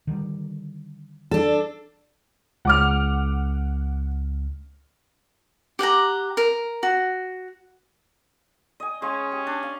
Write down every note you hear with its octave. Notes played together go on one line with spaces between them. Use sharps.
D3 D#3 G3
D4 A4
C#2 F#5 D6 F6
G4 F#5 G5 A#5
A#4
F#4
D#5 G#5
G#3 C#4 F5 C#6
G4
D4
F5